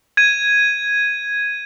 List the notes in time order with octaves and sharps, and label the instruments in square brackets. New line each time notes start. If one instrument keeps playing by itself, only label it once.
[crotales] G#6 D#7